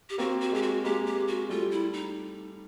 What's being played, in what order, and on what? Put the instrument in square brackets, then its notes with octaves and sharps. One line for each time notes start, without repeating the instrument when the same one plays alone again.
[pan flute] G4
[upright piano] A#3 C4 [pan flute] F#4
[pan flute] F#4
[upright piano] G#3 [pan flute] G4
[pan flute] F#4
[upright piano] G#3 A#3 [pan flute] G4
[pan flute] G4
F#4
[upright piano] G3 A3 [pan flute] F4
[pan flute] E4
D#4